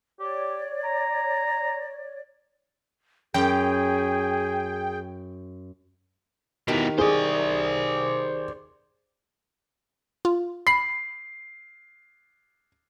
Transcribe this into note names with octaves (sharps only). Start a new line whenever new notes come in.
G4 C#5 D5
A#5
F#2 G#4 G5
B2 D#3 E3 G4
G#4 C5 D5
F4
B5 C7